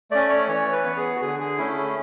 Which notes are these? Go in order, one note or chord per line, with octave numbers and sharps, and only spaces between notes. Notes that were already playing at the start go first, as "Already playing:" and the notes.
A3 C#4 D5
C#5
E3 C#5
B4
B3
G#4
F#4
D3 G#4
G#4
A3 C#4 E4